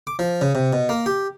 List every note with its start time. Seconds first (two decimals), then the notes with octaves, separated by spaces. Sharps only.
0.07 D6
0.19 F3
0.41 C#3
0.55 C3
0.73 B2
0.89 A#3
1.06 G4